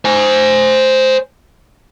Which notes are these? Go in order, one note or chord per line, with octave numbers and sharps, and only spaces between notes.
C5 G#5